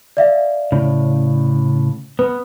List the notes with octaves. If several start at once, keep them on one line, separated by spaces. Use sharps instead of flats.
D5 E5 F5
A2 C#3
B3 B4